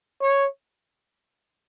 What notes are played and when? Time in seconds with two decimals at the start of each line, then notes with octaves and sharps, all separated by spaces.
0.22 C#5